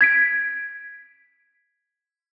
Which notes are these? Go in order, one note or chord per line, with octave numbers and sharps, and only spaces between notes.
G#6 B6 D7